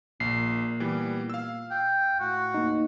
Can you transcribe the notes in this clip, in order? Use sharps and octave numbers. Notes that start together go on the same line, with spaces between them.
A#1 A#2 C7
E3 G3 B3
F5 E6
G5
A2 F#4
A#3 D#4